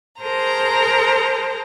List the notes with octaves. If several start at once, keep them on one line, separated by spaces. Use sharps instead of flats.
G#4 A#4 C5 A5 A#5